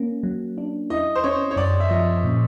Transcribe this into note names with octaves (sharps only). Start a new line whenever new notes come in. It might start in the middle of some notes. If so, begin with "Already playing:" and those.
Already playing: A#3 C#4
F#3
D4
E4 D#5
C5
C#4 C#5
C#5
F#2 D5
E5
F3 D#5
A#2